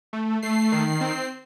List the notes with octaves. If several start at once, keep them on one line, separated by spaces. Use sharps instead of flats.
A3
A3 C7
D#3
C4